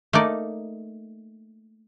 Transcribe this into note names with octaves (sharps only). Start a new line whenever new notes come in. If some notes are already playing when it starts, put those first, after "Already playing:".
A3 A#3 D#4 D5